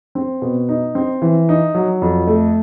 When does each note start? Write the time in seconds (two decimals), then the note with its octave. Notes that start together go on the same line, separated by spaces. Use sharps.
0.15 C4
0.42 B2
0.69 D#4
0.95 C4
1.22 E3
1.49 D#4
1.75 F#3
2.02 F2
2.27 A3